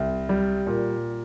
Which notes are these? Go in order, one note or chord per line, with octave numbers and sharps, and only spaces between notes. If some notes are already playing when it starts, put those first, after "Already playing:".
Already playing: C2
G3
A#2